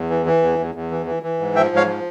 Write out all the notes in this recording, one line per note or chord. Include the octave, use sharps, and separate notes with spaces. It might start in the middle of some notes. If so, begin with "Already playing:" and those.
Already playing: E2
E3
E3
E2
E2
E2
E3
E3
E3
G#2
F3 E5 G5
G#2
C#5 F5
F3